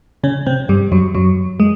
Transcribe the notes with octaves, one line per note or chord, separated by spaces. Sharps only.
C#3 C#4
C3 C4
G2 G3
F#2 F#3
F#2 F#3
G#3